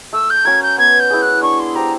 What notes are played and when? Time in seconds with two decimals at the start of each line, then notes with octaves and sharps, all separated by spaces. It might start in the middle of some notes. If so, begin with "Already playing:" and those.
0.13 A3 E6
0.30 G6
0.45 C#4 F#4 A#4 G#6
0.62 G6
0.78 B3 G#6
0.99 G6
1.10 E4 G#4
1.22 F#6
1.42 D4 C#6
1.59 C6
1.75 G4 C5 A#5